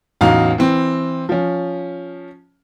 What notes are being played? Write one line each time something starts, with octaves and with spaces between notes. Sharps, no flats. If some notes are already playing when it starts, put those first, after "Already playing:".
A1 E2 F#3 D#4 F5 A#5
E3 C4
F3 C#4